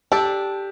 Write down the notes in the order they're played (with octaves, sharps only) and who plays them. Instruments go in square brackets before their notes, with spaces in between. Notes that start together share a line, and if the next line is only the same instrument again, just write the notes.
[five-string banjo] D4 A4 D5 [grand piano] G4